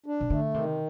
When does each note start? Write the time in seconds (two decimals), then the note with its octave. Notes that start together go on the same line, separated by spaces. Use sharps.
0.06 D4
0.21 C3
0.30 D3 A3
0.54 C3 D#3